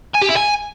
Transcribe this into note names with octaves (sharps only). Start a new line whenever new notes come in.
G#5
G4
E4
G#5